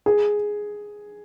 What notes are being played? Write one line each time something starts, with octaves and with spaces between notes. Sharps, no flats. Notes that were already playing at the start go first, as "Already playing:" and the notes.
G#4